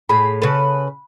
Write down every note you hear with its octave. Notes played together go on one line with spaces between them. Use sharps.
A2 G#4 B5
C#3 A4 B4